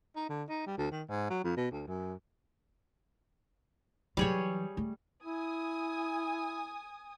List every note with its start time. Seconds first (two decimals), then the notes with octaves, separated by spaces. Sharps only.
0.16 D#4
0.29 D3
0.49 D#4
0.66 G3
0.77 D2
0.91 D#3
1.08 G#2
1.30 F#3
1.44 F2
1.57 B2
1.71 D2
1.87 F#2
4.17 E3 F#3 G3 G#4 C#5
4.77 A3
5.23 E4 G#5 D#6